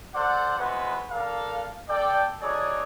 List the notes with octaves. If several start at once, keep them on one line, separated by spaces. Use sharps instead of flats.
A4 C5 D5 F#5
G#3 B3 E4 F#4 B4 C5
D4 A4 A#4 F5
A4 D5 G5
D#4 F#4 G#4 A4 C#5 D5